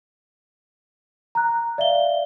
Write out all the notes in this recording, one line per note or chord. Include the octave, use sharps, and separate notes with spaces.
A#5 F#6
D5 E5 F5 G7